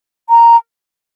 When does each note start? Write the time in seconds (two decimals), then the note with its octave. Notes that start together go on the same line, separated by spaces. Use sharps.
0.29 A#5